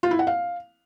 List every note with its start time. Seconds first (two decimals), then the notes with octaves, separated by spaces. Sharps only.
0.03 F4
0.11 E4
0.19 F#5
0.27 F5